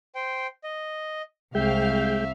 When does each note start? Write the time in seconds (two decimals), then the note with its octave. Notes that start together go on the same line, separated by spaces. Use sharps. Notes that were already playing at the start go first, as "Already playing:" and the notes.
0.15 C5 G5
0.64 D#5
1.55 C2 G#3 E5 F5 G5